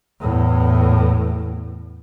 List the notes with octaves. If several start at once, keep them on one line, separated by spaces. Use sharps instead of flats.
E2 A2